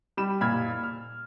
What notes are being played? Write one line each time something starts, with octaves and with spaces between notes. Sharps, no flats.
G3 G4 B5 E7
F#1 A#2 B5 F6 G#6
F6